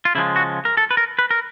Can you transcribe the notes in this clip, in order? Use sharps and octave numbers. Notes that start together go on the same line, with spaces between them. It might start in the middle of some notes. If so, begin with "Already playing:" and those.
F4
C#3 F3 G#3 E4
F#4
A#4
A4
B4
A#4
B4
A#4